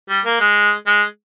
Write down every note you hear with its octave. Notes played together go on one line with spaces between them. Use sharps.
G3
A#3
G#3
G#3